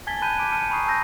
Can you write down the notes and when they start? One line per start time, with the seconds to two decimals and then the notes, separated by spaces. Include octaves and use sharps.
0.07 G#5 A5 G#6 A6 B6 G7
0.22 A5 B5 F#6 G6 D#7
0.37 D6 D7 D#7
0.52 A5 F6 C#7 D#7
0.69 G#5 A#5 B5 C#6 D#6 C7
0.87 A5 E6 G6 A#6